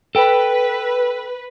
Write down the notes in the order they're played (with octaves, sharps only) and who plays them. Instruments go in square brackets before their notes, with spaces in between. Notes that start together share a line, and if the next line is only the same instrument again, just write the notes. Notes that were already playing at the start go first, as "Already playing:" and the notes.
[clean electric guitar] A4 G5 [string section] B4